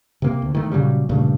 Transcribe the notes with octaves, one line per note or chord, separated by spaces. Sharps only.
C3 A#3
D2
D#3 A3
A#2 C#3 F#3 G3
G2 A#2 C#3 A3